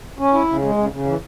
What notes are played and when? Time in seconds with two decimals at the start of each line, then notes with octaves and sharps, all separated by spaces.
0.19 C#4
0.34 E4
0.48 C#3
0.62 G#3
0.77 C#3
0.92 C#3
1.06 E3